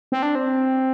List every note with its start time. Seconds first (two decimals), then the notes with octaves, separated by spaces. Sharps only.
0.12 C4
0.22 D4
0.35 C4